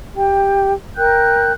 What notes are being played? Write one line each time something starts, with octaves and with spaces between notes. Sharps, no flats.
G4 G5
A#4 G5 F#6 G6